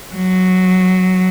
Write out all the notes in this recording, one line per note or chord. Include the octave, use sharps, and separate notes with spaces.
F#3